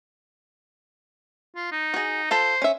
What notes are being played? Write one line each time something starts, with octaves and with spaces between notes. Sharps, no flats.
F4
D#4
F#4 G#4
F4 A4 C5 B5
C#4 E5